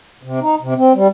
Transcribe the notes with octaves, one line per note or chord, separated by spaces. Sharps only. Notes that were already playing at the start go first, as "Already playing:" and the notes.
C3
D#4
C3
C4
G3